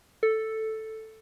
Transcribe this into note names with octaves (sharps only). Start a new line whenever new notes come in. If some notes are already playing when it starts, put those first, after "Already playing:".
A4